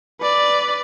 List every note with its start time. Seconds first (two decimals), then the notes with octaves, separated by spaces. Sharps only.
0.21 B4 D5